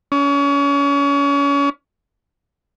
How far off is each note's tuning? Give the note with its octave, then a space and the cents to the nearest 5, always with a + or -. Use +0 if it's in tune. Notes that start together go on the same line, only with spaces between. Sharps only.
C#4 +35